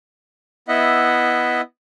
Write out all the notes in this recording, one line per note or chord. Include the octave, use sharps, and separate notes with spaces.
B3 E4 D#5 E5 F#5